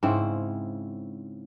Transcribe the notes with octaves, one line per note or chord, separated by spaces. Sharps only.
G#2 C#3 C4 E4